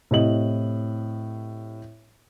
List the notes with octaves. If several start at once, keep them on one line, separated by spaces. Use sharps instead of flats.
A2 C3 D#5 F#7